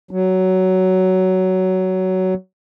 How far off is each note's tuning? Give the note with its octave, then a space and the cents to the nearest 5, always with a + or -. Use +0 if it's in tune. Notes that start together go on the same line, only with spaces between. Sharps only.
F#3 +15